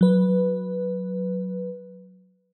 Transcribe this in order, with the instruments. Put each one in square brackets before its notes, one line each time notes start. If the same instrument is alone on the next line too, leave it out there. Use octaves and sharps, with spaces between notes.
[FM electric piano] F#3 B4